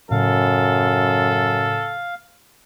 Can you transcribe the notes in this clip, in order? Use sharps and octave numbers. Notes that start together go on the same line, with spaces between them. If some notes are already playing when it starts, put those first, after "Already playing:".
F#2 A2 C#3 F#3 A4 F5